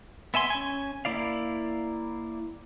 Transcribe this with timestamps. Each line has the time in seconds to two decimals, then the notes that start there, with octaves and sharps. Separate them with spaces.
0.34 B3 E5 G#5 C6
0.50 C#4 G#5
1.05 A#3 E4 D5 F5